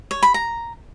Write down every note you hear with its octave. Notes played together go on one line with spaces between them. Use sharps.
C#5
B5
A#5